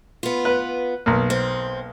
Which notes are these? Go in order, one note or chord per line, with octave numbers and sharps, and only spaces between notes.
B3 F4
B4
B1 A#3
C4